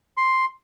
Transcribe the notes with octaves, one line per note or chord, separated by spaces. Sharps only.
C6